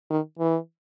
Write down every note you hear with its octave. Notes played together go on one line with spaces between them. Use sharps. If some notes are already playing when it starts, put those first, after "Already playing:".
D#3
E3